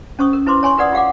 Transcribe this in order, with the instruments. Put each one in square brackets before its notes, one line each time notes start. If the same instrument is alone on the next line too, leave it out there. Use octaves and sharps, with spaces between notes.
[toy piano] C#4 C5 C#6 D#6
A#4
E4 B4 C5 C6 D6
C#5 G#5 C6 C#6
F4 A#4 B4 D5 F#5 D#6
F4 G4 F5 F#5 D6